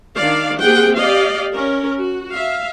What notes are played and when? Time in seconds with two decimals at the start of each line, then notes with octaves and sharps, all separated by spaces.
0.16 D#3 D4 D5 F5
0.60 A#3 C4 G4 G#4 F#5 G5
0.97 G4 D5 D#5 F5
1.53 C#4 A#4
2.00 F#4
2.33 E5 F5